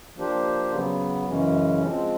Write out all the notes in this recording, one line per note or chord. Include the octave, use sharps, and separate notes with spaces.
F3 A#3 D4 G4 C5
C#3 F#3 B3
F#2 C#3 E3 G#3 C#4
F3 G#3 C4